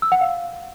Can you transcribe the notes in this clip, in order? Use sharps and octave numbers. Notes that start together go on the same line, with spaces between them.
E6
F#5
F5